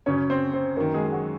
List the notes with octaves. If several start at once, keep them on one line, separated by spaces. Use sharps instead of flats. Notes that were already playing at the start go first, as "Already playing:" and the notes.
F#2 C#3 C#4 C#5
C4 C5
C4 C5
F#2 D#3 A#3 A#4
G#3 G#4
G#4
F#3 F#4